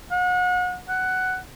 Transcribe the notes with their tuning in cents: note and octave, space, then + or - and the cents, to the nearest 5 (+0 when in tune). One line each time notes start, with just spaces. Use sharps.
F#5 -35
F#5 +10